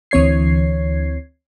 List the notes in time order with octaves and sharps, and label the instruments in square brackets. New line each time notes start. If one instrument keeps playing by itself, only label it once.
[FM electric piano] D2 E3 C4 C#5 G#6 C7